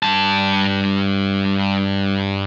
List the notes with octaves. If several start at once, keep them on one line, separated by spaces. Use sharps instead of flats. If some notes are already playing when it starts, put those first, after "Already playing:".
G2 A5